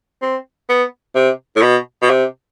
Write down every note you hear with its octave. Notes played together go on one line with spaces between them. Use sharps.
C4
B3
C3
A2
B2
B2
C3